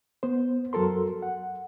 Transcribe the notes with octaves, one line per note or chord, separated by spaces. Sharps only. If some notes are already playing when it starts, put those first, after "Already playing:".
B3 C5
F#2 F#3 F#4 A4 A#4 C6
F#5